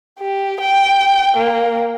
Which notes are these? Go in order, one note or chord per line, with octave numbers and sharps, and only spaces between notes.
G4
G5
A#3